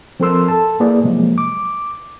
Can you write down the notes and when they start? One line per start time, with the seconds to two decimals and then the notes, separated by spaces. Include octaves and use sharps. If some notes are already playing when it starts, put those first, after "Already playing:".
0.20 F3 C4 A4 A#4 C6 E6
0.48 A4 A5
0.80 A#3 E4 G#4 B4 D5
1.04 C3 F3 F#3 G#3 A#3
1.38 D6